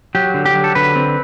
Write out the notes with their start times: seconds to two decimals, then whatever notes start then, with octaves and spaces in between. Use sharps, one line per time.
0.15 F#3 G4
0.34 D3
0.45 G4
0.54 F#3
0.64 A4
0.75 D3 B4
0.96 C4